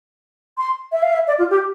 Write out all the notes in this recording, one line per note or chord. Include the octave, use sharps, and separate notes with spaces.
C6
E5
F5
E5
D5
F4
G4